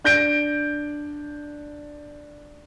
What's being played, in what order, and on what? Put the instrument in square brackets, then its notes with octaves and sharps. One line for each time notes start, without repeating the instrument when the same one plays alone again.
[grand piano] D4 G6 A#6 D7